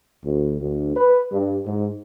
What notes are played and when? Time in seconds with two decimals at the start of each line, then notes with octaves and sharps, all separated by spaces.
0.24 D2
0.61 D2
0.96 B4
1.32 G2
1.66 G#2